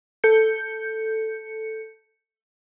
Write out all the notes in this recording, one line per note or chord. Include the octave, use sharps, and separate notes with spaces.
A4 G6 C#7